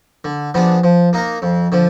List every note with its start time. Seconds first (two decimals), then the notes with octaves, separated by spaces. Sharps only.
0.25 D3
0.54 F3 B3 D4 G#4
0.84 F3
1.13 A#3 D#4 A#4
1.42 F2
1.72 D3 F3